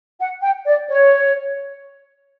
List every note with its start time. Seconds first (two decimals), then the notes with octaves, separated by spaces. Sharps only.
0.20 F#5
0.43 G5
0.66 D5
0.89 C#5